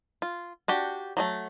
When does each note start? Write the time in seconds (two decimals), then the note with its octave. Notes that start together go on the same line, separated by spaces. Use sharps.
0.22 F4
0.68 D4 F#4 G4
1.17 F#3 G3 A3